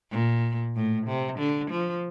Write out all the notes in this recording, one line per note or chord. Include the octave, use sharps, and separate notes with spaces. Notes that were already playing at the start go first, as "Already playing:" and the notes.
A#2
A2
C3
D3
F3